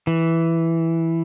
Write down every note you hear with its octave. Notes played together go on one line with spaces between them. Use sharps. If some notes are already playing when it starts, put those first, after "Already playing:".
E3